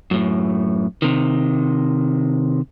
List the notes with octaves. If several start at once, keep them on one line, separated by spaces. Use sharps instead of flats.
F#2 A2
C3 D#3